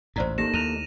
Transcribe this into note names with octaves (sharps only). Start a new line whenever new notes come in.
A1 D#2 G#2 C5 D5 A#5
A3 A#3 D#4 G4 A#6 E7
D#2 E4 D#7 F7